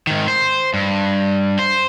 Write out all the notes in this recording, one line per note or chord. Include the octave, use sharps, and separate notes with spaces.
G#2 D#3
C5
G2
C5